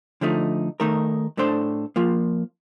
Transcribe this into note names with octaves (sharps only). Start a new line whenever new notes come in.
D3 F3 A3 D#4
D#3 A3 D#4 A#4
A2 A3 D4 A4 C5
F3 A#3 F4